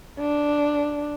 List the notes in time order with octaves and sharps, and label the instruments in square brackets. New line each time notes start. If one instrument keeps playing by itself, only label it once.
[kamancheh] D4